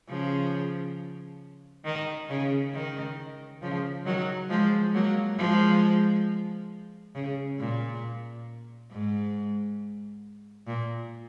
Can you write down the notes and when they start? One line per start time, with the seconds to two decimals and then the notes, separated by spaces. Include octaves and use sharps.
0.09 C#3 F3
1.85 D#3
2.29 C#3
2.74 D#3
3.62 C#3 F3
4.06 D#3 F#3
4.49 F3 G#3
4.94 F#3 A#3
5.38 F3 G#3
7.15 C#3
7.58 A#2
8.91 G#2
10.67 A#2